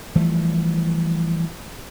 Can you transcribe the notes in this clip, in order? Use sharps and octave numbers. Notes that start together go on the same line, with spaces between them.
E3 F3 G3 A3